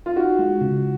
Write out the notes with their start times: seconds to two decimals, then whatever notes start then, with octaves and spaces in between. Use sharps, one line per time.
0.06 F4
0.16 D#4 F#4
0.39 G#3
0.61 C#3